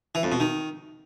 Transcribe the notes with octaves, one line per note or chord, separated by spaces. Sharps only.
E3
F2
B2
D#3